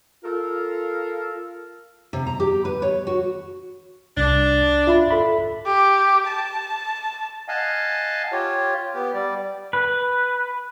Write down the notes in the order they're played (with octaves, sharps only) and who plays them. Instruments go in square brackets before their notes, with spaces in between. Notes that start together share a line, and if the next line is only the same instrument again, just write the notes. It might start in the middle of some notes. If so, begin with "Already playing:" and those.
[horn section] F4 A4 A#4 F5
[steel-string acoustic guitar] C3
A#5
G4
B4
C#5
F#4
[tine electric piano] C2 [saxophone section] D4
[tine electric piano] F4 E5 B5
A4 E5 B5
[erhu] G4
A5
[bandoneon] D#5 F5 F#5 G#5 A5
F4 G4 C#5
B3 G4
G3 D5
[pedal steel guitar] B4